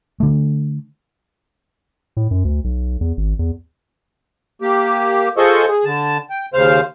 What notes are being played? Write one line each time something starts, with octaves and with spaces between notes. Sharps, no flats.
D3 A3
A2
F#2
D2
B1
E2
G#1
E2
A#3 G4
F4 G#4 A4 C5 D#5 C#6
G#4
D3 A5
G5
D#2 C#3 C5 F5 F6